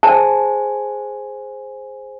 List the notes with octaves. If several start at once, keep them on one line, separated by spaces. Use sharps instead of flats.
G#4 C5 G#5 A5